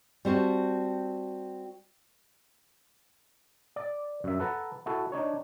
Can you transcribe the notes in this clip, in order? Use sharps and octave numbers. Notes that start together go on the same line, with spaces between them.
G3 C4 F#4 A5
D5
F#2 E5
A4 B4 F#5 A5 A#5
E4 F#4 A4
D4 D#4 C#5